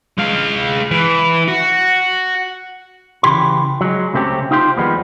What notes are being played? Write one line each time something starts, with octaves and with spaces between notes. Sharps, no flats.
G#3 F5
E3
F#4
C#3 E3 G4 C6
F#3 G#3
C#2 C3 A3 C4 C#4 G4
D#4 F4 G4 C5
D#2 F3 G3 G#3 B3